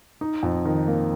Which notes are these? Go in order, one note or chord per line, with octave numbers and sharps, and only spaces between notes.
D#4
F2
D#3
A#3